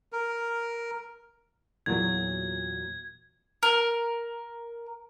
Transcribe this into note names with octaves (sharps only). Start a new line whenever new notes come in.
A#4
E2 A#2 F#3 G#6
A#4